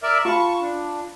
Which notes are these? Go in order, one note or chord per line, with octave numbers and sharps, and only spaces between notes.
A#4 D5 E5
F4 A5 B5 C#6
D4